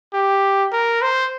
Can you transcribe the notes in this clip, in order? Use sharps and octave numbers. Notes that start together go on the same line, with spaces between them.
G4
A#4
C5